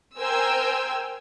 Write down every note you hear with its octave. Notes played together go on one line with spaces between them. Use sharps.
A#4 C5 G5 G#5 E6